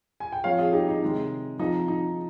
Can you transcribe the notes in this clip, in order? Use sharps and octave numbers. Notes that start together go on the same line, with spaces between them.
G#5
G5
F3 C4 C#5 F5
F4 G#4
D#4 G4
D#4
C3 D#3 G#3
F3 C4 D#4
D#4